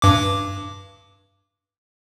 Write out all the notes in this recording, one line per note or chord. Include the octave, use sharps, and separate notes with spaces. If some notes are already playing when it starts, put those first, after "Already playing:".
G2 D6